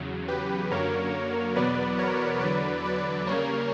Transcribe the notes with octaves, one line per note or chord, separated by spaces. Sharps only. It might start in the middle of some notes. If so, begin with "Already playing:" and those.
Already playing: E2 C#3 F#3
G4 B4
F#2 D3 F#3 A#3 A#4 C#5
E2 B2 F#3 B3 B4 D5
A#4 C#5
E2 D3 F#3 B4 D5
B4 D5
C#3 G3 A#3 A#4 C#5